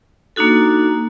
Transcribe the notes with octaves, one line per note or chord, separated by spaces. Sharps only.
A#3 D4 D#4 F#4 A4